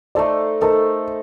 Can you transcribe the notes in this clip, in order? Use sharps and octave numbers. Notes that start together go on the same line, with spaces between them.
A3 D#4 A4 C5 D5
A3 D#4 A4 A#4 C5